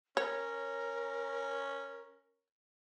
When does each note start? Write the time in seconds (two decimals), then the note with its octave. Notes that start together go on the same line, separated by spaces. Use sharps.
0.17 C#4 A#4 C#5